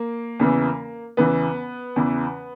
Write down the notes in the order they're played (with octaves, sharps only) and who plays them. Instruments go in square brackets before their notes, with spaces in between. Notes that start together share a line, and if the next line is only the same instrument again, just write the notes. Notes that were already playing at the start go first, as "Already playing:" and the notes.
Already playing: [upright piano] A#3
E2 C#3 E3
E2 C#3 E3 B3
E2 C#3 E3